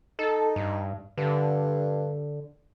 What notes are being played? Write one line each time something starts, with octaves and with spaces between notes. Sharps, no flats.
D#4 A4
G2
G2 D3